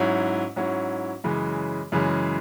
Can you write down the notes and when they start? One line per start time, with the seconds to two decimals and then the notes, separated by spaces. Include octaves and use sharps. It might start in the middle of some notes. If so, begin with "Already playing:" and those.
Already playing: G#2 F#3 C#4 E4
0.56 G#2 F#3 C#4 E4
1.24 F#2 C#3 E3 G#3
1.92 F#2 C#3 E3 G#3